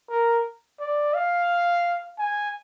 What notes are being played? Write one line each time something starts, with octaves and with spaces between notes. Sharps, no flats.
A#4
D5
F5
G#5